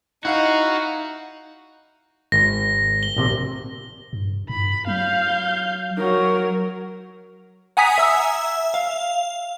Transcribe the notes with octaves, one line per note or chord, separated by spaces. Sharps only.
D#4 E4 F#4 F5 F#5
G#1 A#6
G7
A#1 C3
G2
G2 B5
F#3 F5 G6
F#3 A#4
F#5 G#5 A#5 D#6 B6
E5 E6
F5